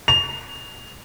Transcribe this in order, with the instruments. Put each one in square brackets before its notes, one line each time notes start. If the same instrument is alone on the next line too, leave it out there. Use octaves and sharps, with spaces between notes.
[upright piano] F7